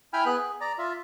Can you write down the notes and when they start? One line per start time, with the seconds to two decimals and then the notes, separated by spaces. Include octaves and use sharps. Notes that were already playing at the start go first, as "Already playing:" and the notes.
0.13 E4 G5 G#5 B5 F6
0.26 B3 G#4 B4 F#6
0.37 G#4
0.61 D5 A#5
0.78 F4 E5